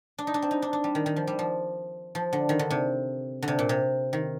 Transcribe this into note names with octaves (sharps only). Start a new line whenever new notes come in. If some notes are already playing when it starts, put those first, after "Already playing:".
D4
D#4
D4
C4
D#4
D4
D4
G3
D#3
D#3
F3
G3
F3
F3
D3
D#3
D3
C3
D3
C3
A#2
C3
D#3